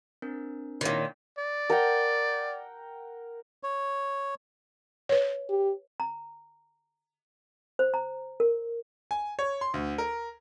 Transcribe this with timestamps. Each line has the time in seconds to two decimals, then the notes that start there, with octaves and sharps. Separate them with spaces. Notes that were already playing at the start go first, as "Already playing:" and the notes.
0.22 C4 D4 A#4
0.81 A#2 D#3 D#4 E4 C#5
1.38 D5
1.70 A#4 F#5 G5
3.63 C#5
5.09 B4 C#5
5.49 G4
6.00 A#5
7.79 C5
7.94 A#5
8.40 A#4
9.11 G#5
9.39 C#5
9.61 C6
9.74 D2
9.98 A#4